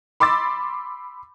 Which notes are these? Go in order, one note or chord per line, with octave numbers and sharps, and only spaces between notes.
B5 C6 D6 E6 A6